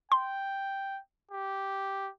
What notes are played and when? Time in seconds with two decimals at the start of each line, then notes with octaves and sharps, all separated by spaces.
0.12 G5 C6
1.31 G4